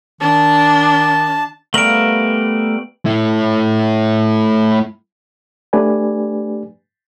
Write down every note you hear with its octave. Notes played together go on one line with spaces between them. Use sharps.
D#3 D4 A5
G3 A3 B3 A#4 F5 D7 F#7
A3 E4
A3 D4 G4 B4 D5 G#5